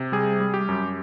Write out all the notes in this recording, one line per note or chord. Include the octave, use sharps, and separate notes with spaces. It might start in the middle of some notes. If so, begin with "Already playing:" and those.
Already playing: C3
G3 G#4
G3
G4
F#2